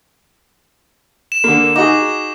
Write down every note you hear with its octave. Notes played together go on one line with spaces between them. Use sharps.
E7
D3 A#3
D#4 F#4 G#4 D6